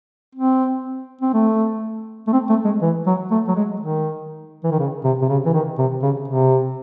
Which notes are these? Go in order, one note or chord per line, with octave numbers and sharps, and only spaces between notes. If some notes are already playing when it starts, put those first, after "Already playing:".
C4
C4
A3
A3
C4
A3
G#3
E3
F#3
A3
F#3
G#3
D#3
E3
D#3
C#3
C3
C3
C#3
E3
D#3
C3
C#3
C3